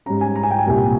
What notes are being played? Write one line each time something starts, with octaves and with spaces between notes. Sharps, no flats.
G#2 G3 C#4 A#5
G#5
A#5
G#5
G5
G#5
C2 A#2 G3